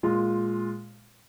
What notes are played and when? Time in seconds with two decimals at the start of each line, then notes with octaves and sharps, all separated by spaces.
0.03 A#2 G#3 F4